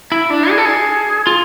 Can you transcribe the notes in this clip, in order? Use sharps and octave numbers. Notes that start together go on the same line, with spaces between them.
E4
D4
G#4
A4
G#4
F4